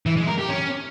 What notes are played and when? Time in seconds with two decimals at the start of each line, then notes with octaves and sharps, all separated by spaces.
0.06 E3
0.17 G#3
0.27 A#4
0.38 G4
0.49 C#4